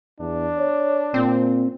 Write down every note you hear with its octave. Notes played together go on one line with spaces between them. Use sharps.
E2 D4
C#5
A#2 C4